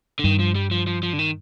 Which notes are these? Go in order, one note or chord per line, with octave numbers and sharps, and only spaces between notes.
D3
G2 D#3
F3
G3
F3
F3
F3
D3
D#3